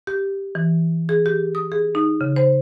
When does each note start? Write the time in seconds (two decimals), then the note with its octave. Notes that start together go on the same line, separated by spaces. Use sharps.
0.07 G4
0.55 E3
1.09 G#4
1.26 G4
1.55 D#6
1.72 G#4
1.95 D#4
2.21 C#3
2.36 C5